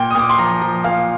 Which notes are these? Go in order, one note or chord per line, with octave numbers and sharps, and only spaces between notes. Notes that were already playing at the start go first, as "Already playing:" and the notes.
Already playing: A#2 G5
D#6
A#2 D6
C6
F3 A#5
F3 A#5
A#2 F5